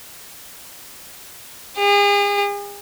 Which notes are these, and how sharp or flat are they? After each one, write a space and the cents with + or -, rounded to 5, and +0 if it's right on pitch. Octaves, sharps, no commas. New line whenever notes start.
G#4 -40